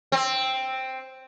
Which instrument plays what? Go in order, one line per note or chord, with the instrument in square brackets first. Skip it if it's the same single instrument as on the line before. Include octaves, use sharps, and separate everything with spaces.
[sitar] C4